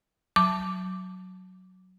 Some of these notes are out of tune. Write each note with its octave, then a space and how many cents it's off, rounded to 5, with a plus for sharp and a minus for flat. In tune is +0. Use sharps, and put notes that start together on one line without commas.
F#3 +0 A5 +0 D6 +0